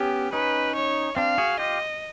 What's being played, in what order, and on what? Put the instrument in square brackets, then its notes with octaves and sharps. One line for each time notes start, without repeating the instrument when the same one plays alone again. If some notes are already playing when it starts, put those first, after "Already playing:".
Already playing: [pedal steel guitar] B3 C#4 [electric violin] G4
[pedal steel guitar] C#4 D#4 [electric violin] B4
[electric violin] C#5
[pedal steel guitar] C4 D4 [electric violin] F5
[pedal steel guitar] F#4 G#4
[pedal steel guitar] F4 G4 [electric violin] D#5